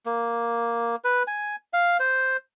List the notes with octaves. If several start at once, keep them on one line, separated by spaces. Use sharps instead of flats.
A#3
B4
G#5
F5
C5